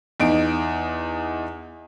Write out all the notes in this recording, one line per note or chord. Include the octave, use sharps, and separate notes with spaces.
E2 D#4 D7